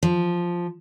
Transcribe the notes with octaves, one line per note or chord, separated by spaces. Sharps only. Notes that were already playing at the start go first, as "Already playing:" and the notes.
F3